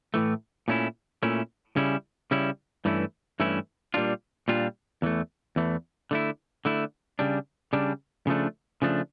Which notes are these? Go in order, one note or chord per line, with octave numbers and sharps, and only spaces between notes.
A2 E3 A3
A#2 A3 C#4 E4
A#2 A3 C#4 E4
C#3 G3 C#4 E4
C#3 G3 C#4 E4
G2 E3 A3 C#4 E4
G2 E3 A3 C#4 E4
A#2 G3 D4 F4
A#2 G3 D4 F4
E2 E3 A3
E2 E3 A3
D3 A3 E4
D3 A3 E4
C#3 G3 D4
C#3 G3 D4
C#3 F3 A3 D4
C#3 F3 A3 D4